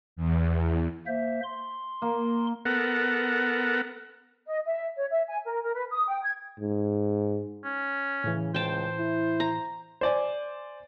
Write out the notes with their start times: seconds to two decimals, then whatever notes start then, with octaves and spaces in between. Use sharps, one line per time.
0.16 E2
1.07 A#3 C5 E5
1.43 C6
2.02 A#3
2.65 B3 A4 A#4 F#5
4.47 D#5
4.66 E5
4.96 C#5
5.11 E5
5.28 G#5
5.46 A#4
5.63 A#4
5.75 B4
5.90 D#6
6.08 G5
6.23 G#6
6.59 G#2
7.64 C#4
8.24 A2 C#3 E3
8.54 C#2 C5 G5 A5
8.99 E4
9.40 A#5
10.01 C5 D5 G#5